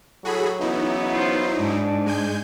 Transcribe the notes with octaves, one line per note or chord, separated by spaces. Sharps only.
A2 F#3 F#4 G#4 A4 B5
C#3 E3 B3 D#4 E4
F4 C5
G#2 D4
G#3 G#5 G6